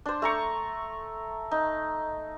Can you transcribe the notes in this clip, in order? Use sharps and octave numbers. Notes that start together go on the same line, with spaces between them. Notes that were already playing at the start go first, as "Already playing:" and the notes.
D4 C5
A3 A#5 C#6
D#4